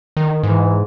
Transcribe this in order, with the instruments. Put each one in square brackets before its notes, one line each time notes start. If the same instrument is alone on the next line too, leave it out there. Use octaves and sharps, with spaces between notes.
[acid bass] D#3
[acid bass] G#2 [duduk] E3